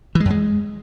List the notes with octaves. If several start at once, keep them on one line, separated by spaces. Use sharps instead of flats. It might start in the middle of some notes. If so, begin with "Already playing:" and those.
E3
G#3
F#2
G#3